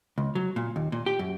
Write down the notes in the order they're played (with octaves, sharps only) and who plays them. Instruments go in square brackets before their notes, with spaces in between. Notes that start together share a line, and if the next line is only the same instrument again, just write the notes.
[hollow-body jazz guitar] C#2
F#3
A#2
D#2
A#2
G4
F#2